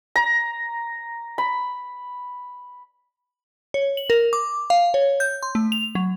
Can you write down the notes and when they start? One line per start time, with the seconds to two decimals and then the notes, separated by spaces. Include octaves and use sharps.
0.16 A#5
1.38 B5
3.74 C#5
3.97 F#7
4.10 A#4
4.33 D6
4.70 F5
4.94 C#5
5.20 G6
5.43 C6
5.55 A3
5.72 F7
5.95 F#3